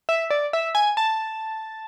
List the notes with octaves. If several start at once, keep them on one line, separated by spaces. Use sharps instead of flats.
E5
D5
E5
G#5
A5